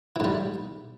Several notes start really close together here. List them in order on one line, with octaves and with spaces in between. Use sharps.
E3 G#2 G3